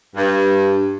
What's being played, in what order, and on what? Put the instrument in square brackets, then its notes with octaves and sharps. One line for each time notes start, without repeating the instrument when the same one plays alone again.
[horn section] G2